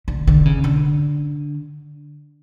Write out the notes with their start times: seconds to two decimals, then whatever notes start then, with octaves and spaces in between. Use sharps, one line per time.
0.08 D3
0.27 D3
0.45 C#3
0.64 D3